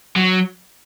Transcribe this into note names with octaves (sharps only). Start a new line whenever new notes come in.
F#3